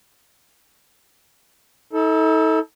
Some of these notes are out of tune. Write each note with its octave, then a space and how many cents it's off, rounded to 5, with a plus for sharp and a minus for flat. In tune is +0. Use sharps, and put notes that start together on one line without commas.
D#4 +45 A4 +0